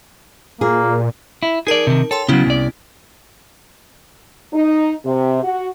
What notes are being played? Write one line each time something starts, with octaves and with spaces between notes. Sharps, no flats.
A#2 A#3 G#4
E4
D#4 G#4 A#4 D5 A5
C3 D#3
A4 C#5 G5 C6
C#3 F#3 B3 C#4 E4
C2 D5
D#4
C3
F#4